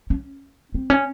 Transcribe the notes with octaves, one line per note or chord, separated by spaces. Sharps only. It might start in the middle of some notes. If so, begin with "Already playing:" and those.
C#4
C4
C#4